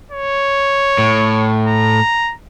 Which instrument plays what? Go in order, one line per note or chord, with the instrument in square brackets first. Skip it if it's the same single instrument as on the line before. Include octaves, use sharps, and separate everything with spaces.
[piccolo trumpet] C#5
[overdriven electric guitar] A2
[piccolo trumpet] A#5